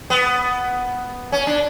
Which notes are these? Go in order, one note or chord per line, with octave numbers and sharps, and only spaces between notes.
B3
C#4
D4